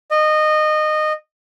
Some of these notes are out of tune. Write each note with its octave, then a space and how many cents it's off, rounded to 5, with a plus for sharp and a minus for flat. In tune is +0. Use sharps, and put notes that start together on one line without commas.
D#5 -20